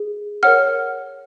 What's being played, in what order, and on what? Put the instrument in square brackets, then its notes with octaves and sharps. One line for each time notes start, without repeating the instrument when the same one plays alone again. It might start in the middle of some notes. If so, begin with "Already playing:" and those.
Already playing: [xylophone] G#4
A#4 C#5 F#5 F6